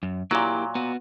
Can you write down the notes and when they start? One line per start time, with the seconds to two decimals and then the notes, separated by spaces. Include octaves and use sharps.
0.03 F#2
0.31 A#2 F#3 A#3 E4 G4
0.75 B3 F#4